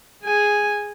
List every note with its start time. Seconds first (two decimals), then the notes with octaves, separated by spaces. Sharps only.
0.23 G#4 G#5